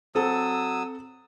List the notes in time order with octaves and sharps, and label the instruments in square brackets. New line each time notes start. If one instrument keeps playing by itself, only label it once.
[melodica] F#3 D#6 E6 [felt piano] C4 A4